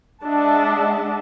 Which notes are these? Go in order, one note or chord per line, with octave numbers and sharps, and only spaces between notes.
G#3 D4 D#5 E5 F#5 A5